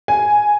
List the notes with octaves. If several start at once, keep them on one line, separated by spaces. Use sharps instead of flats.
G#5